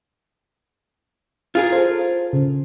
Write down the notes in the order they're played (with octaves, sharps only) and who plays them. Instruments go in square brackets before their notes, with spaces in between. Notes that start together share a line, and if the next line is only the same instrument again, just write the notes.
[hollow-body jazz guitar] F4 G#4 A#4
[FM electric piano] A4 C5
C#3